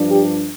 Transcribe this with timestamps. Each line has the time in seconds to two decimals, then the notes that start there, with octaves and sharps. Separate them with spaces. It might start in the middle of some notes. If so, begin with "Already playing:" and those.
Already playing: G2 F3 D4
0.10 G4